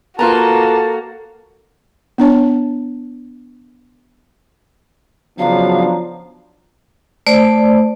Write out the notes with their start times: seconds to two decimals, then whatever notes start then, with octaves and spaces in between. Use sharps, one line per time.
0.19 A3 A#3 F4 F#4 B4 A5 A#5
2.18 B3 D4 C#5 A5
5.39 C#3 F3 F#3 B3 D4 F5 A#5
7.26 A3 C5 D5